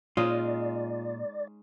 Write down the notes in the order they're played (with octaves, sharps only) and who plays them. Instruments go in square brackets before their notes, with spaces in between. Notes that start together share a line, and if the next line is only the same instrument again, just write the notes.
[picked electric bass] A#2 A#3 [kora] G#3 C#4 D#4 [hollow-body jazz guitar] F4 [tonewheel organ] D5